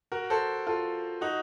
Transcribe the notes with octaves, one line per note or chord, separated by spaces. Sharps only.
F#4 A#4
A4 C5
F4 A4
D#4 F#4